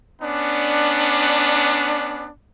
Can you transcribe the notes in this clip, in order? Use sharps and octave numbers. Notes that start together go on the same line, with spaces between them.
B3 C#4 D4